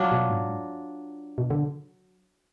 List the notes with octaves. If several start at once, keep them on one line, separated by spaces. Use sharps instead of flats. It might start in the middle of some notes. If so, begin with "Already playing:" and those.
Already playing: F#3 D4 F4
B2
G#2
B2
D3